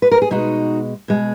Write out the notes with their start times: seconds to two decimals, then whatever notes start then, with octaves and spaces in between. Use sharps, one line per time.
0.02 B4
0.11 A#4
0.22 G#4
0.31 B2 G#3 D#4 F#4
1.08 B2 G#3